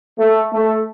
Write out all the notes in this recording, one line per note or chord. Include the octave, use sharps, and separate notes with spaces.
A3
A3